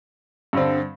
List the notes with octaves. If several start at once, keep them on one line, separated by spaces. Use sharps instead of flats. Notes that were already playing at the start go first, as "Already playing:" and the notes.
G2 D3 C4